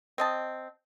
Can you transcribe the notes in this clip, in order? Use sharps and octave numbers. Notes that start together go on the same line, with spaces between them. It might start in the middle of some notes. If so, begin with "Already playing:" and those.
C4 D#5 A5